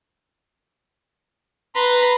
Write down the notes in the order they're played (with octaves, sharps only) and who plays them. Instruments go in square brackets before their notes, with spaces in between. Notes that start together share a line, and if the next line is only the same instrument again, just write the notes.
[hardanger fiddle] B4 [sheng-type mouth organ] A#5 C6